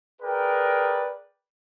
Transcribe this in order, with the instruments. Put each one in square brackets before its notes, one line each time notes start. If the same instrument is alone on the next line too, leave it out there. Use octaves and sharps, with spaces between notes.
[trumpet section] G#4 A#4 B4 D5 G5